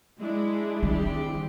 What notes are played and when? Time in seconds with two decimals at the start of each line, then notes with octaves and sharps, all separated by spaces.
0.19 G#3 D4 E4 G#4
0.83 D#3 G3 C4 G4